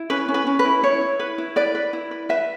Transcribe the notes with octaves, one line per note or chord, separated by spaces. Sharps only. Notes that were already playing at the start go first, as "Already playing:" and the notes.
Already playing: E4
C#4 B4
C#4
B4
C#4
B4
E4
E4 C#5
E4
B4
E4
B4 D5
B4
E4
B4
B4 E5